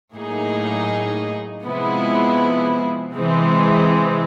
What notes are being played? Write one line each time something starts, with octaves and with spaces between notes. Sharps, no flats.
A2 F#3 A#3 D#4 G#4
C3 F3 G#3 B3 E4
C3 E3 G#3 C4